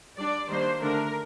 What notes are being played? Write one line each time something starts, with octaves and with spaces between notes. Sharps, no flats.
G3 D4 D5
D#3 G3 A#3 D4 C5
D3 A3 D4 A#4